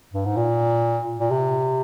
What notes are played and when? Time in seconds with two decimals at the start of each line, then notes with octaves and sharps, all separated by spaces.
0.13 G2
0.25 G#2
0.37 A#2
1.20 A#2
1.31 C3